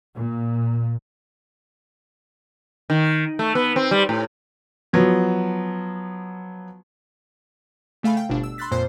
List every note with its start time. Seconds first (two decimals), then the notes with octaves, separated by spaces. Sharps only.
0.17 A#2
2.90 D#3
3.39 A3
3.55 B3
3.76 C4
3.91 G3
4.09 A2
4.93 F3 F#3 B3
8.03 C#3 A3 F5 G#5 B5
8.17 G5
8.29 G1 B2 D4
8.43 E6
8.58 B5 C6 E6 F#6 A6 B6
8.71 F2 A#2 C5 C7